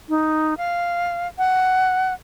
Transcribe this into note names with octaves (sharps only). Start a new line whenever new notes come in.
D#4
F5
F#5